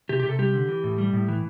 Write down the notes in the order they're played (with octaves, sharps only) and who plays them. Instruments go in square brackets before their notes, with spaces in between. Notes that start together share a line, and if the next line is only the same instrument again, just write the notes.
[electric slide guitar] C3 G4
G4
C3 A4
G3 G4
D3
E3
A2
G3
A2
E3